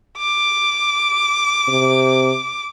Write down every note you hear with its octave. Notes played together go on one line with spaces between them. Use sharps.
D6
C3